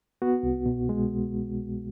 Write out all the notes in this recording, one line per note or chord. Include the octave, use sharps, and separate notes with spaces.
B3 F#4
C2
B2
G#3